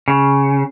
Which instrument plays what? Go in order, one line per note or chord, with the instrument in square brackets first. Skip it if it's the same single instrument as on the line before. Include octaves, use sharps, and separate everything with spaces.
[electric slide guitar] C#3